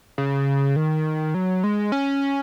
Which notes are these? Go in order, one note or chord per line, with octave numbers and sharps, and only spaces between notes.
C#3
D#3
F#3
G#3
C#4